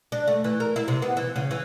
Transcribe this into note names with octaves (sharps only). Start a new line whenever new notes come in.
D4
A3
E3
A#4
E4
C3
B3
E3
C#3
E3